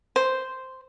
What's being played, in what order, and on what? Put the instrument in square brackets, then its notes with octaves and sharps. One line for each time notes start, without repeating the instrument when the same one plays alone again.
[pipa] C5